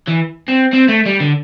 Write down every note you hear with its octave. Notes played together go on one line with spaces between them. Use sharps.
E3
C4
C4
A3
G3
D3